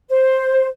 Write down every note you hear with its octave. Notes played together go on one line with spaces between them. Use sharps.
C5